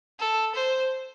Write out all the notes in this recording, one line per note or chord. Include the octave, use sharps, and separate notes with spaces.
A4
C5